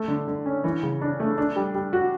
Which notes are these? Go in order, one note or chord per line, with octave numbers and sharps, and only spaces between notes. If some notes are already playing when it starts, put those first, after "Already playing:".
Already playing: A3
D3
D3
C#4
E3
C#3
D4
A3
D4
G3
G3
F#4